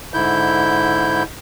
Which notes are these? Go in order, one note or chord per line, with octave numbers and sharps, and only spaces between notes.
G#2 D3 E4 G6